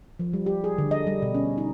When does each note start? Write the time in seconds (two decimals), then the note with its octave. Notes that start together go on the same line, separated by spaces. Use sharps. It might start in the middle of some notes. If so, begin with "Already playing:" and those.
0.19 F3
0.33 G3
0.46 G4
0.64 G#4
0.78 D3
0.91 D#5
1.07 G3
1.22 B2
1.35 C#4
1.58 D#4